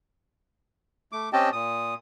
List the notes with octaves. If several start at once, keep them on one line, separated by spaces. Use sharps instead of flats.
A3 D6
C4 C#4 G4 D#5 G5 A5
A#2 D#6